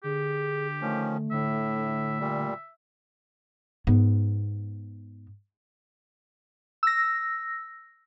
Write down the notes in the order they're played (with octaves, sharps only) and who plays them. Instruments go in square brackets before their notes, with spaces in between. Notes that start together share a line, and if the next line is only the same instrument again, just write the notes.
[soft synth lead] D3 [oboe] G4 [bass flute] G#4
[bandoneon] D#3 F3 C#4 [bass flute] A3
[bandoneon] A2 [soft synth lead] D3 [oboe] E5
[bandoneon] A#2 G3
[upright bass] G#2 B3
[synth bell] E6 A#6